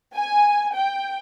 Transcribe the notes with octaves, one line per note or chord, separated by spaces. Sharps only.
G#5
G5